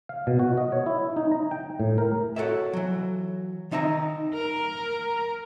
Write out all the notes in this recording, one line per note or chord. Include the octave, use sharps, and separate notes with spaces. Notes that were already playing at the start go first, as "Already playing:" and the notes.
F5
B2
F#4
D#5
C#5
E4
D#4
A#5
G5
A2
A#4
F#4 G4 A4 C#5 E5
E3 F#3
D#3 D#4 E5 F5 A#5
A#4